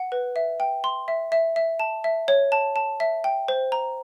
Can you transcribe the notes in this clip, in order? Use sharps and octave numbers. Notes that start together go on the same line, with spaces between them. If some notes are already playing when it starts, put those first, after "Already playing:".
Already playing: F#5
B4
E5
G5
C6
E5
E5
E5
A5
E5
C#5
A5
A5
E5
G5
C5
A#5